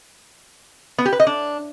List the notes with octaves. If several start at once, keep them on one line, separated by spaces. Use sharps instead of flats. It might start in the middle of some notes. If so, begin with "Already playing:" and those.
B3
G4
B4
D#5
D4